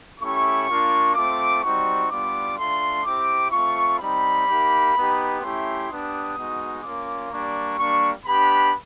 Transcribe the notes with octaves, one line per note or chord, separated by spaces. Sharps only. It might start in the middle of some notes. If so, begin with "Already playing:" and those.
A3 C#4 E4 G4 C#6
A#3 D4 F4
A3 C4 F4 D6
G3 C4 D#4 F#4 C#6
G3 B3 D4 F4 D6
A3 D4 F4 C6
C4 E4 G4 D6
A3 C4 F4 C#6
G3 C4 D#4 B5
A#3 D#4 G4
B3 D#4 G4
A3 C#4 E4 G4 C6
B3 D4 G4 D#6
G#3 B3 D#4 F#4
A#3 C#4 F4 D6
G3 A#3 D4 C#6
G3 A#3 D4 C#6
B3 D4 G4 B5